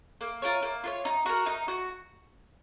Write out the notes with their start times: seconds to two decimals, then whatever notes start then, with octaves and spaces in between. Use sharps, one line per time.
0.21 A#3
0.42 F4 A#4 C#5
0.63 A#3
0.84 F4 A#4 C#5
1.05 D#4
1.26 F#4 A#4
1.46 D#4
1.68 F#4